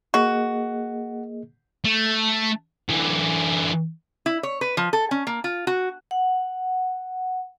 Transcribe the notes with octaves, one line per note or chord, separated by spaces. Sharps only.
A#3 F#4 G#4 D#5
A3
D3 E3
E4
C#5
B4
F3
A4
C#4
A#3
F4
F#4
F#5